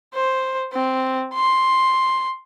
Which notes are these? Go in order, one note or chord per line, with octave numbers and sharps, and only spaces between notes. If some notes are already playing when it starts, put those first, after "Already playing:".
C5
C4
C6